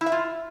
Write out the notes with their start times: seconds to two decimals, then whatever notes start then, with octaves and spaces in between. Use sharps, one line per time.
0.01 E4
0.06 E5
0.12 F4